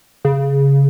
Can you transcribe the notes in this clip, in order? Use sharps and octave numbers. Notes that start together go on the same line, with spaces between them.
C#3